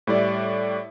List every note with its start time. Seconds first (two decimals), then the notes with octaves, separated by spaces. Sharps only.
0.07 A2 G3 E4 D5